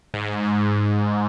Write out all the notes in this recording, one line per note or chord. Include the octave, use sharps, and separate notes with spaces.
G#2